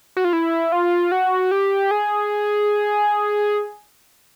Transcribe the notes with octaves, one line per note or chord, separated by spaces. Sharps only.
F#4
F4
E4
F4
F#4
G4
G#4